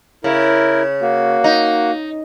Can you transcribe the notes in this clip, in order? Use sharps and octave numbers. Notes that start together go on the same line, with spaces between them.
C#3 E4 A#4
A#3 F#4
D#4